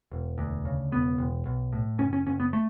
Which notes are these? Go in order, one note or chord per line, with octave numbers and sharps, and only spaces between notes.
E1
D2
C#3
E1 B3
E1
B1
A2
F#1 C#4
C#4
F#1 C#4
B3
A3